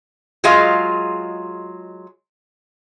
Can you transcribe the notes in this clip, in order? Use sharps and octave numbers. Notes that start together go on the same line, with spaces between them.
F#3 G#3 F4 G#4 D#5 F5